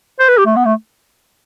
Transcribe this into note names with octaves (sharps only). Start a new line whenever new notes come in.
C5
B4
G4
A3
B3
A3